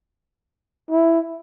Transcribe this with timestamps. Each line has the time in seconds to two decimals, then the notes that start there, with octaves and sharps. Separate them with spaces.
0.90 E4